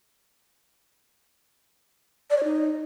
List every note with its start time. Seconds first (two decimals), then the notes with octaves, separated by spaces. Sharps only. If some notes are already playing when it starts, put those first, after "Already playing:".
2.30 D5
2.37 C#5
2.44 D#4